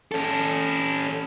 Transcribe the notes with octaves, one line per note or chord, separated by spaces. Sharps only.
C#4 A4